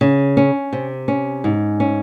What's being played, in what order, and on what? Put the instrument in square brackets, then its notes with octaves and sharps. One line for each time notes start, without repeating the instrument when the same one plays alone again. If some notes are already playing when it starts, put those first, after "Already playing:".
[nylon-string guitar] C#3
C#4
C3
C#4
G#2
C#4